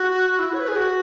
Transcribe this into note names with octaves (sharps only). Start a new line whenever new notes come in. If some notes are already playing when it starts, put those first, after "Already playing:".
Already playing: F#4
E4
C#5
B4
G#4
F#4